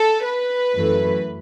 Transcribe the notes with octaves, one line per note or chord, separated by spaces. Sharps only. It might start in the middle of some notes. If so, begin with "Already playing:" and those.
Already playing: A4
B4
F#2 E3 A3